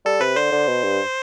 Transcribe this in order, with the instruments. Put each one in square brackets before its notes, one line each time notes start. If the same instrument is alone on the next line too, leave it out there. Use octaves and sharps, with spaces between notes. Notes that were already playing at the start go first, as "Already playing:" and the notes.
[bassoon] G3 [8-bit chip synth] A4
[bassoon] C3 [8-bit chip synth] B4
[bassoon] D3 [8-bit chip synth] C5
[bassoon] D3
B2
G2